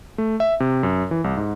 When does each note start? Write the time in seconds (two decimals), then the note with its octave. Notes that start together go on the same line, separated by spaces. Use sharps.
0.18 A3
0.40 E5
0.60 C3
0.83 F#2
1.11 E3
1.24 C2
1.37 G#2